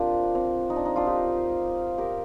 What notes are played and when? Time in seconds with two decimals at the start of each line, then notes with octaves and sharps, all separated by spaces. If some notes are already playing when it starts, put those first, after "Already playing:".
Already playing: C4 D4 F4 G4 A#4 C5
0.35 C4
0.70 D#4
0.76 D4
0.85 D#4
0.96 D4 F4
1.07 D#4 G4
1.98 G4 A#4